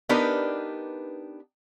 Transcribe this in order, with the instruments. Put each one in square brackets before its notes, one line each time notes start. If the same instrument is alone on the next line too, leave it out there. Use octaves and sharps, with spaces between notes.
[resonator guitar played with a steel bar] B3 D4 D#4 G4 A#4 B4